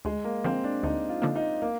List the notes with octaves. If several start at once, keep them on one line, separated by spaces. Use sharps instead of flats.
D2 G#3
A#3
D3 F3 A#3 C4
D4
D2 D#4
F4
D3 F3 A#3
D#4
A#3